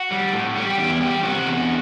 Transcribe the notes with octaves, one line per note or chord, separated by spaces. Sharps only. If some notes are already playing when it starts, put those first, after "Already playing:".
Already playing: F#4
G3
A2
G3 F#4
G4
E2 G4
E4
G3 G4
C3 F#4
E2